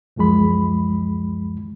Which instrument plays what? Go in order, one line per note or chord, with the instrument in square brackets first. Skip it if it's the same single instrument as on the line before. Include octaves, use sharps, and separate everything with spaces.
[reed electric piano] C#2 F#2 F3 G#3 B5